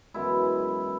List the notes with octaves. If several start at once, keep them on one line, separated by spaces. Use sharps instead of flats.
F#2 E3 G#3 B3 E4